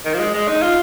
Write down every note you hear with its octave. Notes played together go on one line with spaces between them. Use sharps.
D#3
F3
G#3
G#3
D#4
F4